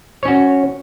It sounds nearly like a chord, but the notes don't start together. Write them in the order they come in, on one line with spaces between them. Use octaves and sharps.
C#5 C#4 F#4